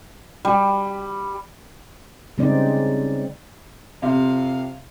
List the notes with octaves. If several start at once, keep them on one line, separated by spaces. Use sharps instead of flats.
G3
C#3 G3 G#3 C4 D#4 D5
F2 C3 C4 F5